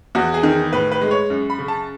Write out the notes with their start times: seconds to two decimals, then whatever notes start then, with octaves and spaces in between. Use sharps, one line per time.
0.15 E2 F#4
0.34 G#4
0.43 D#3
0.73 A2 B4
0.92 B4
1.01 G#3
1.11 C#5
1.30 F#2
1.50 B5
1.59 C#3
1.68 A5